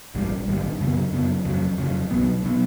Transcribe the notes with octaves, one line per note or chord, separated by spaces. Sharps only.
A#1 G#2 D#3 G3
A#1 G#2 D#3 G3
F#2 C#3 F#3 B3
F#2 C#3 F#3 B3
F2 C#3 F#3
F2 C#3 F#3
C2 B2 F#3 B3
B2 F#3 B3